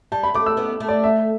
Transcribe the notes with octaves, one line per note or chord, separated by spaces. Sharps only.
G3 A5
B5
A3 D6
E6
B3
A3
D5
E5